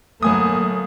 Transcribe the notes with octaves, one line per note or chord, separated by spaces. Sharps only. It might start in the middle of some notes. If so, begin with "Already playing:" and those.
G1 F#3 A3 A#3 G#5 D#6